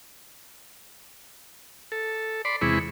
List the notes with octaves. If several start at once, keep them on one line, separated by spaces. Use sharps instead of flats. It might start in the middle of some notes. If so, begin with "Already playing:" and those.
A4
D5 B5 C6
E2 C3 G#3 E4 B5 C#6